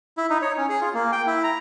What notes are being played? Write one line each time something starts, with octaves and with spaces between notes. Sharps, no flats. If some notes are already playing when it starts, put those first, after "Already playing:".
E4
D#4
C#5
C#4
G#4
F4
A#3
G5
E4
A#5